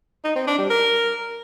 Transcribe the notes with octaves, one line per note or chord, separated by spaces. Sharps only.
D#4
C4
D4
G3
A#4